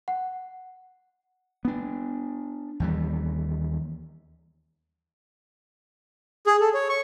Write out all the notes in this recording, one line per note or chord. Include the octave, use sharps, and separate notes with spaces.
F#5
B3 D4
D#2 E3 G3
G#4
A4
C#5
C#6